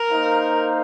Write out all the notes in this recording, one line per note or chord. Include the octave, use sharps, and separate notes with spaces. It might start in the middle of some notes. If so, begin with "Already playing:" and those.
Already playing: A#4
A#3 D#4 C5 F5